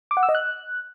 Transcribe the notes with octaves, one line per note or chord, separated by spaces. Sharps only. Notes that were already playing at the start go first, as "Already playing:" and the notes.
D6
F#5
E6
D#5
F#6